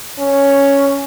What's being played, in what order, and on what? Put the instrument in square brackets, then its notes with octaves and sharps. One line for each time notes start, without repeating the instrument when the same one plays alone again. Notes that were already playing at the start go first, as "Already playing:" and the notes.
[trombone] C#4